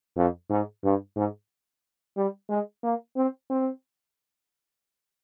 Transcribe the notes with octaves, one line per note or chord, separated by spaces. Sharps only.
F2
G#2
G2
G#2
G3
G#3
A#3
C4
C4